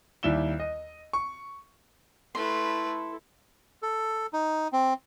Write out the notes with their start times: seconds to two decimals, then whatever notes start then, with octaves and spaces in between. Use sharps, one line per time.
0.23 D#2 G3 E4 E7 G7
0.60 D#5
1.13 C#6
2.35 A3 E4 A4 B4 C6
3.82 A4
4.33 D#4
4.73 C4